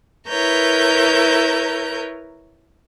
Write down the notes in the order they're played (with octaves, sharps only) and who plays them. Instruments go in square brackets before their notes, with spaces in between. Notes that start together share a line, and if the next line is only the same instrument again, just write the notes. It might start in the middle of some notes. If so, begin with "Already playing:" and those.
[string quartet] E4 A#4 B4 C#5 A#5 G6